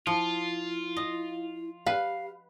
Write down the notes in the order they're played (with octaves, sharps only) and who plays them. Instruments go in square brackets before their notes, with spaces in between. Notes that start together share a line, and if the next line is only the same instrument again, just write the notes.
[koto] F3 [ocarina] E4 [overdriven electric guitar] F4
[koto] D#5
[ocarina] G4 [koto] B4 [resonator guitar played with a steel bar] F5